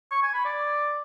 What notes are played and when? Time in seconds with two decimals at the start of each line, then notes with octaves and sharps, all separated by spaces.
0.11 C#6
0.23 G#5
0.34 B5
0.45 D5